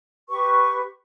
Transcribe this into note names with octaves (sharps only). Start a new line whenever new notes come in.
G4 B4 C#6